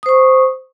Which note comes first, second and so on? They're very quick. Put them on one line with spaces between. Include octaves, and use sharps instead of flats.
D#6 C5 C#6